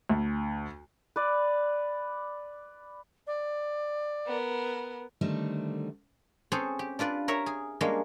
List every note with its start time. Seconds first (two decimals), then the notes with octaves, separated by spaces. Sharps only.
0.09 D2
1.16 B4 D5
3.27 D5
4.26 B3 A#4
5.21 D3 D#3 G3 A3 C4
6.52 C4 C#4 G#4 A4 C5
6.79 G4
6.99 D4 F4 B4 D5
7.28 A#4 C#5 E5 A#5
7.46 G#4
7.81 G3 G#3 A#3 C#4 D4